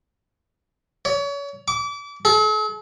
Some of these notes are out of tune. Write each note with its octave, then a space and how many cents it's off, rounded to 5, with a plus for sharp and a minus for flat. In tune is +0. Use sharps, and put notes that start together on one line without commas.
C#5 +35
D6 -30
A4 -45